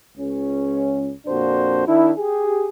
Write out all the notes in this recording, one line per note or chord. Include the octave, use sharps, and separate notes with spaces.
C#2 C#4
F2 A#2 D4 F#4 C5
D#3 D4 E4
G4 G#4